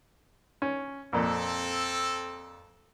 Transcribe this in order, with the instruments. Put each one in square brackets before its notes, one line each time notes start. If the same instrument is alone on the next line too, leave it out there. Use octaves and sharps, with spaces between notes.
[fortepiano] C#4
[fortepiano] F2 A#2 [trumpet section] C4 A4